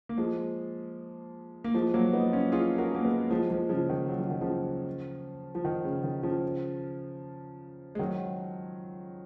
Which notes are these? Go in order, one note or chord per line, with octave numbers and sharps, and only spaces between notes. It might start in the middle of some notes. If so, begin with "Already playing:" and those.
A#3
F3 G#3
A#3
F3 G#3
F#3 A#3
B3 D#4
C#4 F4
F4 G#4
F#4 A#4
A#3
G#3 B3
F3 G#3
F3 G#3
C#3 F3
D#3
F#3
F3
D#3
C#3 F3
F3
D#3
C#3
D#3
C#3 F3
G#3
D#3 F#3